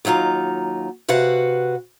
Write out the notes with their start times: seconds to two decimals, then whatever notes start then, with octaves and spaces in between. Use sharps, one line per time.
0.05 D#2 F#3 D#4 F4 A#5
1.09 C3 F#4 B4 F5 F#5